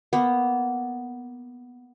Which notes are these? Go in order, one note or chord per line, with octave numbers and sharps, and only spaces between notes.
A#3 B3